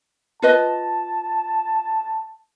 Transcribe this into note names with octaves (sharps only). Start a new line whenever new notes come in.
F4 B4 D#5 A5